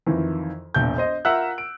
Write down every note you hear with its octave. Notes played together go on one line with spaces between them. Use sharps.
F2 D#3 E3
E1 A#1 G6
C5 D#5
F4 A#4 E5 F#5 E6 F#6
D7